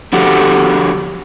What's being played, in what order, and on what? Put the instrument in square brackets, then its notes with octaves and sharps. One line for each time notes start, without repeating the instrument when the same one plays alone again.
[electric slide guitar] D3 F3 F#4 G4 A4